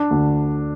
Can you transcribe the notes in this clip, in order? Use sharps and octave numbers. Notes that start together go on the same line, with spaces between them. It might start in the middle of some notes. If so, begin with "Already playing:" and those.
Already playing: D4
D2